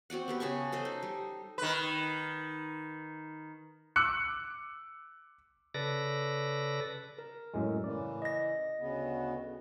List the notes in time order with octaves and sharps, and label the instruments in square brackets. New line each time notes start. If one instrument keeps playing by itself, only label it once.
[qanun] C4 F#4 D5 F#5
B3 G4 B4
C#3 G#4 A5 C#6
A4 C5 D#5
D#4
G3
[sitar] D#3 B4
[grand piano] D6 E6 F#6 C#7
[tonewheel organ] C#3 A4 B4 D5 A#6
[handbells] A#4
[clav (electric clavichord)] F#2 A2 G#3
[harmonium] C#3 E3 [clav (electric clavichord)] D5
[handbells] D#5 A#6
[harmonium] D2 C#3 B3